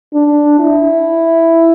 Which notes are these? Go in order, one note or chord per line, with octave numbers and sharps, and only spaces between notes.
D4
E4